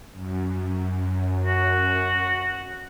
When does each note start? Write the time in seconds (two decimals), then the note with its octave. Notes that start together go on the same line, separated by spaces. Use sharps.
0.12 F#2
1.45 F#4